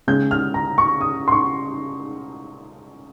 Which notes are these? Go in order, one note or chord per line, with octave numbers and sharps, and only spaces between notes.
C#3 G#3 G6
F6
A#5
C#6
D#6
C6
C#6